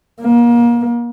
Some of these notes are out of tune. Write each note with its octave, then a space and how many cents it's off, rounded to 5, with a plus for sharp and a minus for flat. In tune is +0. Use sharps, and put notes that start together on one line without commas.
A#3 +30